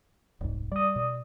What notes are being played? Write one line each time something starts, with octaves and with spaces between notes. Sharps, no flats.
D#1 C2 G#2
G3 D5 D#6
B2